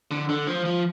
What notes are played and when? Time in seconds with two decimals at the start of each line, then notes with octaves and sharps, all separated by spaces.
0.11 D3
0.29 D3
0.47 F3
0.65 F3